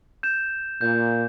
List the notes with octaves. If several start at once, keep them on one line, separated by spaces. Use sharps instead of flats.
G6 E7
A#2 G6